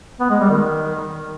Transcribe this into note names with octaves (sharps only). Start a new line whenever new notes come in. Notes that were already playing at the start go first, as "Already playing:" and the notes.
B3
G#3
G3
D#3